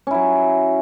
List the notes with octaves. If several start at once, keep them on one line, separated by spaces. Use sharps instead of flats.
F#3 C#4 E4